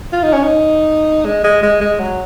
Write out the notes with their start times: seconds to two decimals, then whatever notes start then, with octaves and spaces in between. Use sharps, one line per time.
0.13 F4
0.23 D#4
0.33 C#4
0.43 D#4
1.25 G#3
1.44 G#3
1.63 G#3
1.81 G#3
1.99 F#3